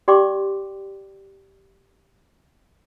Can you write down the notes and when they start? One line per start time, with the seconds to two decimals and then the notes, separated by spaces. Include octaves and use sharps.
0.08 G4 D5 G5 C6 D6